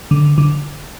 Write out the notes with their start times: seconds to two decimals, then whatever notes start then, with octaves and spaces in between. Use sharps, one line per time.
0.11 D3
0.38 D3